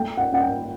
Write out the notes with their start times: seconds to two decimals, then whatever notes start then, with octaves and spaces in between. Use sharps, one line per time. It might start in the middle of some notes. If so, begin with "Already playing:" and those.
Already playing: A3 G5
0.17 F#5
0.30 C#4 F#5
0.41 G5